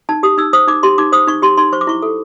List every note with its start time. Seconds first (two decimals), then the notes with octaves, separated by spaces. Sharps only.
0.09 D#4 A5
0.23 G4 D#6
0.38 D#4 E6
0.53 C5 D#6
0.67 D#4 D6
0.83 G4 C6
0.98 D#4 D6
1.12 C5 D#6
1.27 D#4 C#6
1.42 G4 C6
1.57 D#4 C6
1.73 C5 C#6
1.81 D6
1.87 E4 C#6
2.02 A4